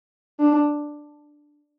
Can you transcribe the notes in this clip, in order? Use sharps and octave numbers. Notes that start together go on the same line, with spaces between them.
D4